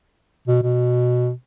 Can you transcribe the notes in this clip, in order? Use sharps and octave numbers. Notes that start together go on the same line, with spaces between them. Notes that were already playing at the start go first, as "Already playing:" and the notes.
B2
B2